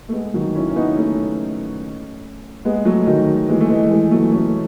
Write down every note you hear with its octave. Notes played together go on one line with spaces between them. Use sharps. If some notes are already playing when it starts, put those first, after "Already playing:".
A3
G#3 B3
D#3 F#3
C#4 E4
C#4
B3 D#4
A3 C#4
G#3 B3
F#3 A3
D#3 F#3
E3 G#3
A3
E3 G#3
E3 G#3
F#3 A3
A3 C#4